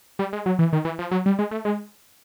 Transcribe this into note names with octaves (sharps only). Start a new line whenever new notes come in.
G3
G#3
F#3
E3
D#3
E3
F3
F#3
G3
G#3
A3
G#3